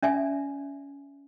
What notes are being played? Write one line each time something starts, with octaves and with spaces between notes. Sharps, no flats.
C#4 D5 E5 G#5